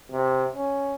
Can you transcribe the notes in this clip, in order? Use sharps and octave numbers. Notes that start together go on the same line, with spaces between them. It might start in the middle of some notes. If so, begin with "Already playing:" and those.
C3
C#4